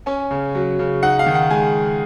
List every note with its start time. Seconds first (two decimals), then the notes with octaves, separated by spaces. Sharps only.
0.06 C#4 G#5
0.31 C#3
0.55 F#3
0.79 C#3
1.03 D#4 F#5
1.19 F5
1.26 D#3
1.35 F#5
1.50 G#3 G#5